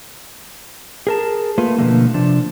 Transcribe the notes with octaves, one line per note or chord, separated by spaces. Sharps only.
G#4 A#4 A5
A3 A#3 F4 B4
B2 D3 E3 F3 A3 A#3
C3 F3 D4